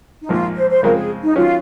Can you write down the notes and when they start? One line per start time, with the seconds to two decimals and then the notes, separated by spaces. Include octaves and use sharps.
0.22 D#4
0.29 A#1 G#2 F3 A#3 F4
0.55 C5
0.69 C5
0.82 C#3 F3 G#3 C4 F4 A#4
0.96 G#4
1.22 D#4
1.36 D#3 F#3 C#4 F4